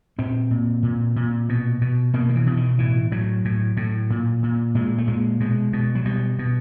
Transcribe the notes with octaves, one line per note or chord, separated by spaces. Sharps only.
A#2 C4
A#2
A#2
A#2
B2
B2
B2 A#3
D#3
E3
B2
D#3
A2 E3
A2 F#3
A2
A2
A#2
A#2
A#2 G#3
A3
A#2 G#3
B2 G#3
B2
F#3
B2 G3
B2